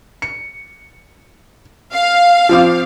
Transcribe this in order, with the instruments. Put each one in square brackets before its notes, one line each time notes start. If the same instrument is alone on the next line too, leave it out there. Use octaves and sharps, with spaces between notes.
[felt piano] C#7
[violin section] F5
[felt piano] F3 C4 D6